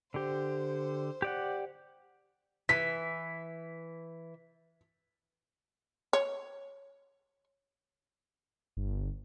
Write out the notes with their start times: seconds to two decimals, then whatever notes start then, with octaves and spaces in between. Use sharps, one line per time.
0.14 D3 G4 C5
1.22 G4 D5 F#5
2.69 E3 B6
6.13 C#5
8.77 G1